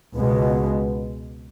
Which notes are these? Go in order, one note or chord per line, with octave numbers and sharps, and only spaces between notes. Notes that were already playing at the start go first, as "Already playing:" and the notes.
C#2 B2 G#3 B3